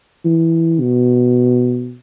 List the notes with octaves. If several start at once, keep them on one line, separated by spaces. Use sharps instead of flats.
E3
B2